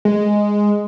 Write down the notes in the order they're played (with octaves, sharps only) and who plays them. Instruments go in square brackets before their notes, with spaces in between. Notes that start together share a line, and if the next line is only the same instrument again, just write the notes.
[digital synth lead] G#3